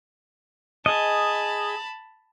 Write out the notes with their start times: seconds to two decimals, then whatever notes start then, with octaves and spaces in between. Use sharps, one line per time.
0.86 G#4 D#5 A5 B5